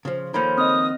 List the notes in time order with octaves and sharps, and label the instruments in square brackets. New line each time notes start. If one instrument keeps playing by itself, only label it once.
[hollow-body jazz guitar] C#3 F3
[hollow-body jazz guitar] D#3 F3 A#3 [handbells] A4 C5 C#5 [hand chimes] B5
[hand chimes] C4 [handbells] D#5 F6 [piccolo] D#6